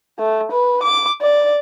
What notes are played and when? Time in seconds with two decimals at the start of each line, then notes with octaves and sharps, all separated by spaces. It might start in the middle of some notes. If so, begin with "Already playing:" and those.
0.19 A3
0.52 B4
0.83 D6
1.22 D5